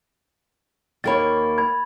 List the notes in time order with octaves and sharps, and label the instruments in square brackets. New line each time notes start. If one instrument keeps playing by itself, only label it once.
[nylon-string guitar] D#2 A#3 C#5 [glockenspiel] B5 A6
[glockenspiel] B5 G#6